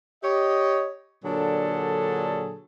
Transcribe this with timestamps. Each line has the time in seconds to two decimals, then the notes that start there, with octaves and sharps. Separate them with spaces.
0.23 G4 C#5 D#5
1.24 A#2 D3 F#3 D4 G#4 A4